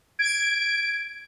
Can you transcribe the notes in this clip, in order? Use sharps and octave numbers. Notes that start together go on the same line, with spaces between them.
G#6 D7